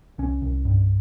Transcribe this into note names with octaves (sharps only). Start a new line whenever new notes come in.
C2 C#4
C2
G2